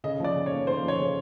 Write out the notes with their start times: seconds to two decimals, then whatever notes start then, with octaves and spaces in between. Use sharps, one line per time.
0.04 C#3 D#5
0.20 F3 D5
0.35 C#3
0.46 C#5
0.51 A#3
0.67 C#3 C5
0.82 F3
0.88 C#5
0.99 C#3